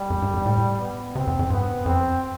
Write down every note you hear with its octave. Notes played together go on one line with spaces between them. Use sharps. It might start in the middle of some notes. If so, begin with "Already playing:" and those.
Already playing: G3
F2
G2
F2
A2
B3
C3 C4
E2
F2
G2 B3
F2 C4